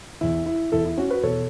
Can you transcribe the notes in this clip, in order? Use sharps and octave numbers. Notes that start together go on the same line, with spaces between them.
E2 E3 E4
E4
E2 E3 E4 A4
E4
C#4 F#4
F#4 B4
E2 B2 A4 C#5